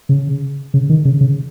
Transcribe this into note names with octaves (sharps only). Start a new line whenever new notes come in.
C#3
C#3
D#3
C#3
C#3